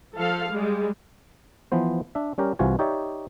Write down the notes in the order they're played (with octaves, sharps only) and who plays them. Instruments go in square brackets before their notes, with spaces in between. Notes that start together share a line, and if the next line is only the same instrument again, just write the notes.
[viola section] F3 A4 F5
G3 G#3
[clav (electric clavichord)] E3 F3 B3 C5
D4 E5
G3 C#4 G4 A#4
C2 C3 E3 F4 F#4 G#5
D#4 G4 C#5 D5 E5